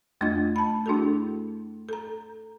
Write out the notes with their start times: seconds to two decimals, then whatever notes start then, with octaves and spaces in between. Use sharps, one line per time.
0.21 F2 A3 D4 F4 D#5 G#6
0.56 A5 B5
0.86 A3 D4 E4 F#4 G#4 A4
1.89 A4 A#5